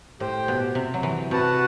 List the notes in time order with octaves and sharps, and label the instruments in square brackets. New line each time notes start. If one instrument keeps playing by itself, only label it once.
[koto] A2 [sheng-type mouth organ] G4 C5 G5
[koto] B2
C3
F#3
E3
[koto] C3 [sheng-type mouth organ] F#4 B4 F#5 A5